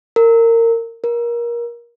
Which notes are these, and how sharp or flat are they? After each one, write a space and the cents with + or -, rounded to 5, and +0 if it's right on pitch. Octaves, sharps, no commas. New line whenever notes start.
A#4 -25
A#4 +25